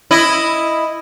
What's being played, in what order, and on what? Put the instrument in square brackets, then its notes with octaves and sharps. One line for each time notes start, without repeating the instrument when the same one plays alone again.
[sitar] E4 D#5